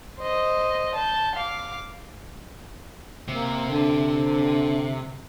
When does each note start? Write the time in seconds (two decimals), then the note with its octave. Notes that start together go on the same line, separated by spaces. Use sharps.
0.20 C5 D#5
0.95 A5 G6
1.35 F5 D6
3.28 C3 A#3
3.70 D3